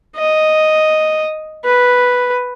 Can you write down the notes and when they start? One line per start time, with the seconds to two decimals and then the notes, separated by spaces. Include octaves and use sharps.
0.17 D#5
1.65 B4